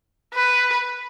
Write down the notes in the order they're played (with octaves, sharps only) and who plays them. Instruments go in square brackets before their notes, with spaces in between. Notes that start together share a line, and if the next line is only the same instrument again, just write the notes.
[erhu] B4